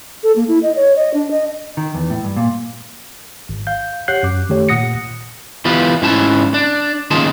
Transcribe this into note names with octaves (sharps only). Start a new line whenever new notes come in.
A4
A#3
E4
D#5
C#5
D#5
D4
D#5
D#3
E2
A2
G2
A#2
G#1
F5 G6
G4 C#5 F#5 F#6 G6 C7
F#2 D6
D#3 A3 G4 C#5
A#2 F#5 D#6 A#6 C#7
E3 B3 F4 G4 B4
G#2 C#4 E4 A5
D4
D#2 D#3 C#4 F4 G#4 A5